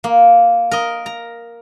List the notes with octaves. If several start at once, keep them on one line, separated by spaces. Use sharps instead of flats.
A#3
A#4 D#5
A#5